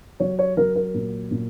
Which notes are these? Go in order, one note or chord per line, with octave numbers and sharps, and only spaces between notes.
F#3 C#5
C#5
F#3 A#4
A#4
A#2
A#2